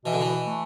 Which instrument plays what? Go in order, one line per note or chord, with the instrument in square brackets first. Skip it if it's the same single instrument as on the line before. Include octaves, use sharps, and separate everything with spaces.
[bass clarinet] B2 [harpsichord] E3
[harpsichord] D3
E3
[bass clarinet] A3